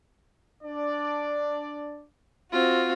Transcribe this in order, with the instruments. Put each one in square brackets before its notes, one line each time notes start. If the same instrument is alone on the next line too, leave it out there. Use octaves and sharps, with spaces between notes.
[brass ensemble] D4 D5
[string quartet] C4 F4 F#4